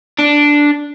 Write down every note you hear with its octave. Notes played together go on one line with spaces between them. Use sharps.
D4